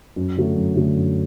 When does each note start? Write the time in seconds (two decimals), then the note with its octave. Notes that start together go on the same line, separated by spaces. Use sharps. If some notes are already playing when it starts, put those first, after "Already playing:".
0.16 F#2
0.37 D3 F#3 A3
0.56 F#2
0.76 D3 F#3 A3
0.95 F#2